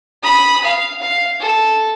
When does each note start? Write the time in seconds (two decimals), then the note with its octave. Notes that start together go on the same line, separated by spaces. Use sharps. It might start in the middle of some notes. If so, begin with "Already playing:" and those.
0.23 B5 D#6
0.65 F5
1.02 F5
1.40 A4